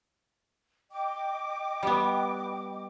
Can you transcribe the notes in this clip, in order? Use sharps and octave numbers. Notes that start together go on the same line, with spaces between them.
D#5 G5 D6
G3 B3